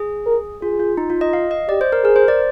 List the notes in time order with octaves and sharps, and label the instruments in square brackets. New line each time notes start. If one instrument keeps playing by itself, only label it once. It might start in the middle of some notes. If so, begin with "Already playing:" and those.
Already playing: [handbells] G#4
[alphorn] A#4
[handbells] F4 [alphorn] G#4
[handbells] F4
D#4
F4
D#5
F5
D#5
[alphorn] G4 [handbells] D5
[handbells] C5
A#4
[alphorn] G#4 [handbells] A#4
[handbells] C5
D5